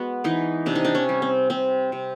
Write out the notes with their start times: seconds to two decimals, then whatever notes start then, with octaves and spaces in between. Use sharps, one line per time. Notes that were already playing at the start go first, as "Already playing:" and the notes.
Already playing: G#3 B3 F#4
0.24 E3 D#4
0.66 C3 D4
0.75 D#4
0.85 D4
0.95 C#4
1.09 G3
1.22 C4
1.50 C3 C4
1.92 C3